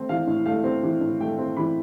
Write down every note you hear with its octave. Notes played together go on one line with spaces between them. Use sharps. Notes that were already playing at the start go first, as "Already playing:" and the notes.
Already playing: A3 C4
E3 F5
A2
A3 F5
C4
E3
A2
A3 G5
C4
E3 B5